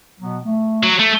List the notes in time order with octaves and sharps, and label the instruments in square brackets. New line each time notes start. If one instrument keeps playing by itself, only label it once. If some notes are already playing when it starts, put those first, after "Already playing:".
[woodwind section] B2 F#3 B3
A3
[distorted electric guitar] F#3
A3